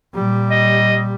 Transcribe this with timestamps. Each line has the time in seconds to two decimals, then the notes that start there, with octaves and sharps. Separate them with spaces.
0.15 A#2 G3
0.51 D#5